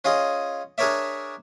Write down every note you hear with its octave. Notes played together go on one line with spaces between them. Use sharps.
C#4 F4 G#4 D#5
D4 G#4 A#4 C#5 D5 E5